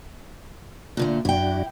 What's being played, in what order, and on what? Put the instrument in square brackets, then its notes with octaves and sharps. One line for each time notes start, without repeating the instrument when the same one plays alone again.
[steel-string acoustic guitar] A#2 D3 A3
[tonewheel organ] F#2 D4 F#4 [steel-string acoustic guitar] E4 G5